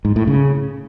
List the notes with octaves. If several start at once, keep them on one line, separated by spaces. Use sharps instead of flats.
G#2
A2
C#3